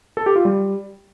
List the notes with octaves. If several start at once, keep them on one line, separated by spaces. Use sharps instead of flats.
A4
G4
F4
G3